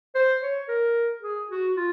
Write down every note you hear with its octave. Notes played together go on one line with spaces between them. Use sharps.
C5
C#5
A#4
G#4
F#4
F4